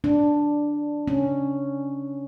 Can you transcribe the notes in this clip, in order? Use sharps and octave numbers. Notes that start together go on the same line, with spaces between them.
D4
C#4